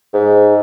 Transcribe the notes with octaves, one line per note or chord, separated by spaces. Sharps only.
G#2